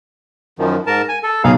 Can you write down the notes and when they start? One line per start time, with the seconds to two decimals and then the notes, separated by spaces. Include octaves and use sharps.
0.59 F#2 D#3 F3
0.87 G#2 A#4 A5
1.09 G#5
1.23 A4
1.44 B1 G#4 F5